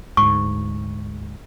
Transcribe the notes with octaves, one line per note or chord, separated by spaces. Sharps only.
D2 G#2 C#6